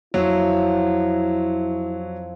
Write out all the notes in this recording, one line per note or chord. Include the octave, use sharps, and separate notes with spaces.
F2 F#3 E4